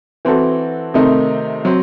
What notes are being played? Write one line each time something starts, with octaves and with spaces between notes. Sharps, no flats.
E3 C4 F#4 A4
C3 D#3 A3 C4 D#4
F#3 C4